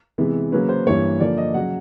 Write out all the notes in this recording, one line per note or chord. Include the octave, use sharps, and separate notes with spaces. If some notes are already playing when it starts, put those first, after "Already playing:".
C3 E3 G#3 B3
C#3 F#3 A#3 C#4 B4
C5
G2 E3 G3 A#3 C#5
D3 F3 A#3 D5
D#5
C#3 F#3 F#5